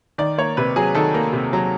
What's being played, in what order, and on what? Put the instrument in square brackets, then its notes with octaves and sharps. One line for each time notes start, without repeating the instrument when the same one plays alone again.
[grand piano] D#3 D5
A#3 C#5
C3 B4
F#3 G#4
D#3 A4
A#3
C3
F#3